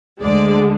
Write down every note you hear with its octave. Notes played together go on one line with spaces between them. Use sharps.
D2 D3 G#3 D5